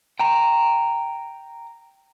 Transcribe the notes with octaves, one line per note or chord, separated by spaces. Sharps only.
G5 A#5